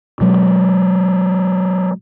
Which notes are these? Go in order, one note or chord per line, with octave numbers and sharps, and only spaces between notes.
B2 F#3 G#3